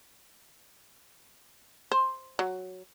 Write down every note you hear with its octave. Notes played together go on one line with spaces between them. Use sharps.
C5
F#3